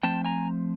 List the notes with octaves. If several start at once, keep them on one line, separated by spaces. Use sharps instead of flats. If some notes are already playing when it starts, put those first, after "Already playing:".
F3 A3 C4 G5 A5
G#5 A#5